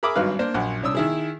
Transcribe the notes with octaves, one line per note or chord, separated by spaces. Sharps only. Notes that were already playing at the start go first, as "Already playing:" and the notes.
G#4 A#4 E5 B5 D6 D#6
G#1 G2 F#3 D#4 B4 F5
A#3 D4 C5
A#1 F#2 F#5
C2 C#4 D4 D#6 E6
D#3 E4 G#4